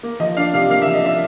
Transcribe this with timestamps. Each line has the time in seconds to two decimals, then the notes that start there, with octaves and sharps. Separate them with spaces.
0.03 A#3
0.20 F3 D#5
0.37 D4 F5
0.53 C3 F5
0.70 A#3 F5
0.82 E5
0.87 F3
0.94 D#5
1.03 D4 E5